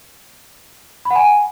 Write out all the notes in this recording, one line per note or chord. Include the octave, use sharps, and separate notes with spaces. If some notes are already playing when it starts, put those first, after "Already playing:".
B5
F#5
G#5